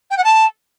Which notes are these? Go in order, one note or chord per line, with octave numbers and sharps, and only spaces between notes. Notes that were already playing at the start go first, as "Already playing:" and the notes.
G5
F#5
A5